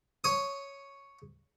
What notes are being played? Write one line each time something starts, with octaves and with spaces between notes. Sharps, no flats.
C#5 D#6